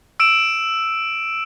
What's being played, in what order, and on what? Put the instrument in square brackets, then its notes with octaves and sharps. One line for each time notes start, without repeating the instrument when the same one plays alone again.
[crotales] E6 D7 E7